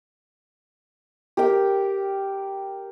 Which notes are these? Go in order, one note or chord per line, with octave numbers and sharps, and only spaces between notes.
G4 A#4 G5